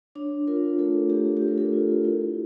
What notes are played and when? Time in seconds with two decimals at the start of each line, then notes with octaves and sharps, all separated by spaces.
0.15 D4 C#5
0.47 F4 A#4
0.78 A3 A4
1.10 A3 G4
1.37 D4 G4
1.48 A#4
1.58 A4
1.73 F4
2.05 E4